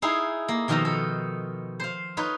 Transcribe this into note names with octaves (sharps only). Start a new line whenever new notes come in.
D#4 E4 G#4 F5
A#3
B2 D#3 F3 F4 A4 A#5
A4
C5 F5
D#4 F4 B4 C#5